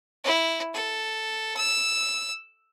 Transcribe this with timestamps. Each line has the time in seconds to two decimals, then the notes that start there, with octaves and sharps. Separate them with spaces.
0.24 E4
0.74 A4
1.57 E6